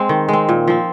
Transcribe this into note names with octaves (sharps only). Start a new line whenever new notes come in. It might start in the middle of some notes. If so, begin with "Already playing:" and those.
Already playing: G#3 C4
D#3
G#3 C4
A#2
F3 C4